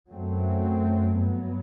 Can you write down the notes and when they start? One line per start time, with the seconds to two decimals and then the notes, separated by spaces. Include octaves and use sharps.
0.10 F#2 F#3 A3 C4
1.14 G2 F#3 B3